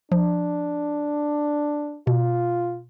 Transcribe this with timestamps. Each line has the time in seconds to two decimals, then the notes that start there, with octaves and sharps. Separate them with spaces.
0.12 F3 D4
2.07 B2 F4